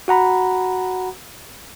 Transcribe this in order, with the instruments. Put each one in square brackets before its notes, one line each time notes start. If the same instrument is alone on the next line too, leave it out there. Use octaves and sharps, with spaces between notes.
[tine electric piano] F#4 F#5 A#5 B5